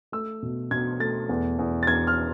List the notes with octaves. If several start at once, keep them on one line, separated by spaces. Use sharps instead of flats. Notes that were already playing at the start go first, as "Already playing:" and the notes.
A3 E6
B2
B2 G#6
A3 A6
E2
E2
A6
E2 G#6
F6